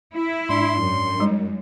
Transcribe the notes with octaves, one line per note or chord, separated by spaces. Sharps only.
E4
G#2 D4 C6
F#2
G3 G#3 D#4